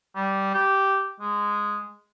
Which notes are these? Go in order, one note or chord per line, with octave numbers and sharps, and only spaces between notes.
G3
G4
G#3